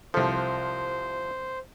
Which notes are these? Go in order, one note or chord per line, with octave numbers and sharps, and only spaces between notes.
C2 F3 A4 C5